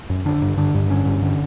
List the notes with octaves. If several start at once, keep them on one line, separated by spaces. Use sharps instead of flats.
F#2
D3 D4
G2
D3 D4
G2
D3 C#4
G2
D3